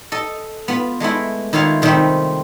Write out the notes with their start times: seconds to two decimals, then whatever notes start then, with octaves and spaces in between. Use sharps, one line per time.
0.12 A4 D#5
0.68 B3 F4 B5
1.00 G#3 A3 B3 E4
1.53 D#3 E4 F4 C#5 F5
1.82 C3 D#3 G3 A3 C4